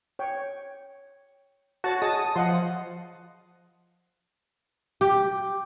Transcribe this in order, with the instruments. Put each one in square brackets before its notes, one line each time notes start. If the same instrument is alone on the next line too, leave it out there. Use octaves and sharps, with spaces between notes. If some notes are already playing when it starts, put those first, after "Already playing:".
[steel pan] C#5 G5
[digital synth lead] F#4 [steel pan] C#5 A5
[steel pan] G#4 D#5 A5 [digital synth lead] D#6
[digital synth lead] F3 [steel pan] D#5 F#5 C6
[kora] G4